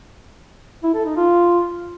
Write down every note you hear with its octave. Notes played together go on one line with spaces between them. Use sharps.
E4
A4
D#4
F4